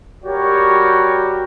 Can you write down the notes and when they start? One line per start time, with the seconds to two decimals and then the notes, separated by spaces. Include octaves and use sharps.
0.24 G3 F#4 G4 A#4 C#5